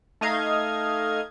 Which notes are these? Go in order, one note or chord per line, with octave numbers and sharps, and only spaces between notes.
A3 D#4 D#5 F5 G#6